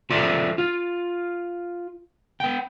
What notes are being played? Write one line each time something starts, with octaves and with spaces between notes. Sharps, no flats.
F4 A4 C5 D5 E5 C6
F4
B3 G5